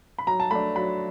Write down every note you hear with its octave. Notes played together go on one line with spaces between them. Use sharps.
B5
F#3 A#5
A5
A3 D4 B5
F#3 B5